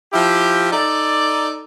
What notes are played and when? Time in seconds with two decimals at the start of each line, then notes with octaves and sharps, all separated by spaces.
0.13 F3 E4 G4
0.71 D#4 A4 D5